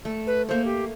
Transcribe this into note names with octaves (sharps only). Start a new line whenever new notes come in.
A3
B4
A3 A#3 C5
G4